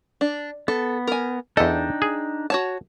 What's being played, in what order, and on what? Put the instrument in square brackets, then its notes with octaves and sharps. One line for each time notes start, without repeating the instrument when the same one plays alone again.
[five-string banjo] D4
[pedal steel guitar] B3 [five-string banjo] A4
[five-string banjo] A#4 G#5
[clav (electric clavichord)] E2 A4 [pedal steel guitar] D4 D#4 G5 [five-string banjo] D#5
[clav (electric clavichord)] G#4
[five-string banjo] F#4 C#5 A5